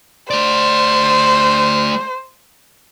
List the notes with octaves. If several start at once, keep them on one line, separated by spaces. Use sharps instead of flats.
A3 C5 D5